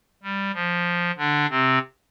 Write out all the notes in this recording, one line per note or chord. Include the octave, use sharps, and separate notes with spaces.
G3
F3
D3 D4
C3 C4